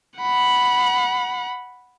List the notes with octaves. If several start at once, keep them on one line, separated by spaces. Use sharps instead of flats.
F#5 B5